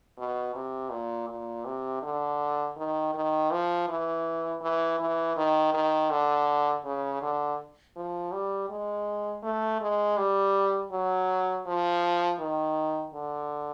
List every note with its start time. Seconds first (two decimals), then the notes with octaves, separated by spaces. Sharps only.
0.18 B2
0.55 C3
0.91 A#2
1.29 A#2
1.65 C3
2.02 D3
2.77 D#3
3.14 D#3
3.51 F3
3.88 E3
4.61 E3
5.00 E3
5.37 D#3
5.74 D#3
6.10 D3
6.85 C#3
7.21 D3
7.96 F3
8.32 G3
8.69 G#3
9.43 A3
9.81 G#3
10.17 G3
10.92 F#3
11.66 F3
12.39 D#3
13.14 D3